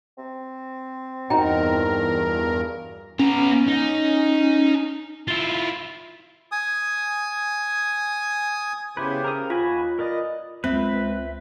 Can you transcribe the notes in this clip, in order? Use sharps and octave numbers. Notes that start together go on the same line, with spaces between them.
C4
E2 G2 D#4 F#4 A#4 G5 A#5
B3 C#4 A#5
D#4
E4 F4
G#5 D#6
C#3 B3 E4 G4 B4 C5
A#4 D#6
D#2 F4 F#4 G#5 B5
A#4 B4 D5 D#5
C#2 C4 B4 E5